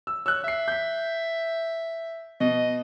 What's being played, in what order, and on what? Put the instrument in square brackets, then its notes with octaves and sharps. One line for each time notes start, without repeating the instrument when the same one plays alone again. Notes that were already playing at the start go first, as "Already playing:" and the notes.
[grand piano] E6
[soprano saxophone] C#5 [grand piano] E6 F#6
[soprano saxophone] E5 [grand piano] E6 C7
[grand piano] G6 B6
[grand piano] B2 [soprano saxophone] D#5